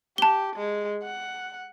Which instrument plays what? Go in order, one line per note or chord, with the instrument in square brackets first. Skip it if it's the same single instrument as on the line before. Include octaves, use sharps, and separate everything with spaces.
[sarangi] G4 [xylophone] A5 G7
[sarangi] G#3
F#5